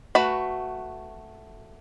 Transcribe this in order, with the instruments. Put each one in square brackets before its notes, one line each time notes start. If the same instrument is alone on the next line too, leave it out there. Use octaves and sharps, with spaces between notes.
[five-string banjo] A3 F#4 B4 A#5 B5